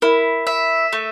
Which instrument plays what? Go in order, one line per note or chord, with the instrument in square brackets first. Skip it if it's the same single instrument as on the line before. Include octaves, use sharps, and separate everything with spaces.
[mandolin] E4 [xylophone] A#4
[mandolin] E5
A3